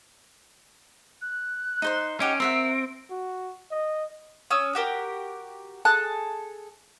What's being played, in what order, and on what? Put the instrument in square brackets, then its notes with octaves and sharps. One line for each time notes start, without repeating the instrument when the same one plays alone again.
[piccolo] F#6
[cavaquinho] D#4 C5 C6
[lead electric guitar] C#4 [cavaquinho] D#4 G4 F#5 [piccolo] D7
[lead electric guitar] C4 [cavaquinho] A#4 E5 F#5
[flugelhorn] F#4
D#5
[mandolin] C#4 D#6 E6
F#4 G4 A#4
G#4 A4 A5 F#6